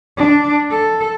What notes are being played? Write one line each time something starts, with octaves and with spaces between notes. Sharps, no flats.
D4
A4